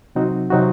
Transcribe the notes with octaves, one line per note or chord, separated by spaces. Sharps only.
C3 F#3 C4 D#4 F#4
C3 F#3 C4 D#4 F#4